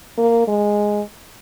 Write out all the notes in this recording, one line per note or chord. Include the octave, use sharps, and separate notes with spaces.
A#3
G#3